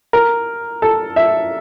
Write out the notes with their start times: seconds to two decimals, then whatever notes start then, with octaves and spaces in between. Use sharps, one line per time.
0.13 A#4
0.82 A4
1.16 E5